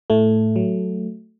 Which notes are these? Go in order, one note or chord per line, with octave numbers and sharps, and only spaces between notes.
A2 A3
F#3